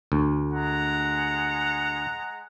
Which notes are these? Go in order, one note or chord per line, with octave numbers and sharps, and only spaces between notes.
D2
G#3 F#5 A#5